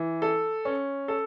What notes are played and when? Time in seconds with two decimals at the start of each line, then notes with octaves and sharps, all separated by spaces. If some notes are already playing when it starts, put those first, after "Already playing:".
Already playing: E3
0.22 A4
0.65 C#4
1.08 A4